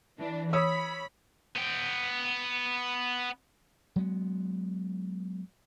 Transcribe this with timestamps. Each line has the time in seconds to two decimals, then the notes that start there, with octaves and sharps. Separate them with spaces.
0.17 E3 D4
0.53 C#5 B5 D#6 E6
1.56 B3 G5
3.96 F#3 G#3 B3